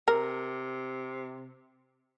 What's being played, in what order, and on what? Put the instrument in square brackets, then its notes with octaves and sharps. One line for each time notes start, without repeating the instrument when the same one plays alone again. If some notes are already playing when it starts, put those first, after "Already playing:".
[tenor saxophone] C3 [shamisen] A#4